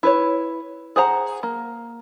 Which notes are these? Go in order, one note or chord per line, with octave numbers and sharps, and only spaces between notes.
E4 B4 C#5
G#4 C5 F#5 A#5
A#3